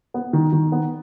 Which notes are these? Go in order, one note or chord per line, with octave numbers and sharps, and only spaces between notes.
B3
D#3
D#3
B3